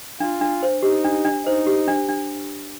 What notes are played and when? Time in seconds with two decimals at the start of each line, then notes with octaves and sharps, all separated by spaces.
0.20 D4 F4
0.41 D4
0.63 C5
0.83 D#4 G4
1.04 D4
1.25 D4
1.46 D#4 C5
1.67 G4
1.88 D4
2.09 D4